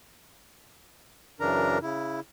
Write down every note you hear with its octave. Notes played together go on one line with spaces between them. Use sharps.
F#2 C#3 E3 D4 A#4 A#5
C#3 E4